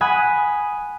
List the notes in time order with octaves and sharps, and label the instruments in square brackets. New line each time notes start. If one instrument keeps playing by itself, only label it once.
[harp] F#5 G#5 B5 D#6